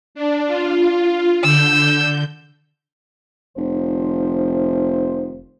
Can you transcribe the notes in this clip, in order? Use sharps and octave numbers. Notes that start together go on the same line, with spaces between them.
D4
F4
D3 E6 G6
F1 D#3 F3 C5